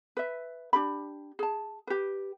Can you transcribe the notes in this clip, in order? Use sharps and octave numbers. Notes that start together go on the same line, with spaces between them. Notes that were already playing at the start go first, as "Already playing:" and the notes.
B4 E5
D4 G4 B5
G#4 A5
G4 B4